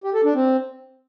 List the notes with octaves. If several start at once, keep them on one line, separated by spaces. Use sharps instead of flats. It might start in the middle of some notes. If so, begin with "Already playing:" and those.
G4
A4
D4
C4